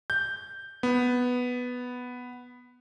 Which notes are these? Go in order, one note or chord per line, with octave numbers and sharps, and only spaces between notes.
G6
B3